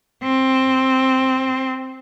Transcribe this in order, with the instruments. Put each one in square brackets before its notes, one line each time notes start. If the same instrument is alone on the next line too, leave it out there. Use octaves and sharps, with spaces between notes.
[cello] C4